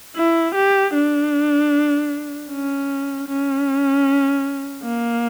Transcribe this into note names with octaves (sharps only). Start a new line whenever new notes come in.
E4
G4
D4
C#4
C#4
A#3